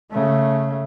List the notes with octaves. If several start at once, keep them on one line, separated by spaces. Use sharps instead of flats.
C#3 A3